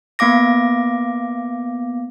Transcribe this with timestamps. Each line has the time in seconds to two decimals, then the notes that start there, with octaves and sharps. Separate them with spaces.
0.19 A#3 B3 F5 D6 A#6